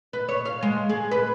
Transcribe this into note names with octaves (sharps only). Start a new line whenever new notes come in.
B4
C#5
F5
G#3
G#4
B4